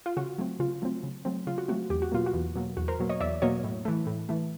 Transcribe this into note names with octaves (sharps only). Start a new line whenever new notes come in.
F4
C#3 F#4
F#3 A3 C4
C#3 F4
F#3 A3 C4
C#3
F#3 A3 C4
C#3 F4
F#4
F#3 A3 C4 F#4
E2 G4
F#4
B2 F#3 A#3 F4
F#4
E2
B2 F#3 A#3
E2 F#4
A#4 C5
B2 F#3 A#3
C#5 D#5
E2 D5 E5
B2 F#3 A#3 C#5 D#5
A2
E3 A3
A2
E3 A3